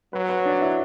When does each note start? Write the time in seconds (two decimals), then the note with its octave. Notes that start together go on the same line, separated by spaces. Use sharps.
0.13 F#3 B4
0.29 B4
0.45 D4
0.62 E4